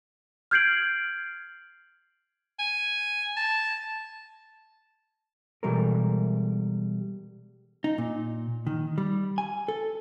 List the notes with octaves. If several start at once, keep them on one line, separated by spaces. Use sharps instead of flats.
F6 G6 G#6 C7 D7 F#7
G#5
A5
B2 E3 G3 G#3 A4 A#4
D#4
A#2
D#3
G3
G#5
A4